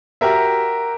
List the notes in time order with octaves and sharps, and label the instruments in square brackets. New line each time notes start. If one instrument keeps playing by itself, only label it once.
[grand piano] F#4 G4 A#4 E5